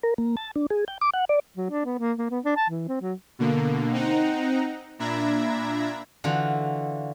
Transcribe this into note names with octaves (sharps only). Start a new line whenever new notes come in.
A#4
A#3
A5
D4
G#4
G5
D6
F#5
D5
F#3
D4
B3
A#3
A#3
B3
D4
A5
E3
C4
F#3
B2 D3 A#3
C4 D#4 F#5 A#5
A#2 D4 E5 A#5 B5 G#6
D3 E3 F4 F#4